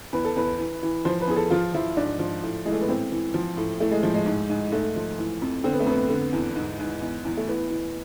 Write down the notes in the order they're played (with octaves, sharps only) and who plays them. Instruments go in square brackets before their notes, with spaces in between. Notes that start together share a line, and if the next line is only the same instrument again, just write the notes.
[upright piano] E2 B4
A4
E2 B4
E3
E3
F3 C5
B4
E2 G#4
A4
F3 F4
F3 E4
G#2 D4
F3
A2
E3 G#3
A3
B3
A2 C4
E3
F3
A2
E3 A3
G#3
A2 F3
G#3
G#2
G#2
G#2 A3
F3
E3
F2
D3 C4
B3
A3
F2 B3
D3
E2
G#2
G#2
E2
E2
A3
E3 B3
E3